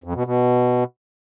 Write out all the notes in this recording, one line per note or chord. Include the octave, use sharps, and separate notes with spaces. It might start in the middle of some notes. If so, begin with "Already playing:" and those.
F2
B2
B2